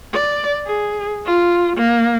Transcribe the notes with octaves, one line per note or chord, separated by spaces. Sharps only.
D5
G#4
F4
A#3